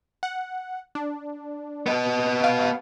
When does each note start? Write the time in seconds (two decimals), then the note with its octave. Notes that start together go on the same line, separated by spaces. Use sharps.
0.23 F#5
0.95 D4
1.86 B3 D#5
2.44 F5